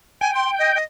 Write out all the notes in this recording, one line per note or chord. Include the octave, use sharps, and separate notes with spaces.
G5 G#5
C6
D#5
D#5